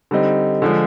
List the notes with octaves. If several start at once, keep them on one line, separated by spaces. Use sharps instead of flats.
D3 G3 C4 D#4
D3 F3 G#3